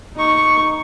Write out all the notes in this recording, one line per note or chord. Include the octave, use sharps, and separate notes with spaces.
D#4 C#6